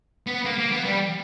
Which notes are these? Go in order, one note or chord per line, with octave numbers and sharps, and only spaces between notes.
B3
A#3
A#3
B3
G3